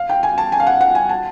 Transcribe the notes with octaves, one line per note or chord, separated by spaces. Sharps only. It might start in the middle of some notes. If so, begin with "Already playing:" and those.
Already playing: F5
G5
G#5
A5
G#5
F5
F#5
F#5
G#5
A5